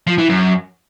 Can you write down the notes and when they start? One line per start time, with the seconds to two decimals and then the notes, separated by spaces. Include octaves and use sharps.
0.07 F3
0.18 E3
0.29 F#2